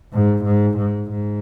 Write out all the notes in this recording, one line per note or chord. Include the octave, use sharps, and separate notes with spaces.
G#2
G#2
G#2
G#2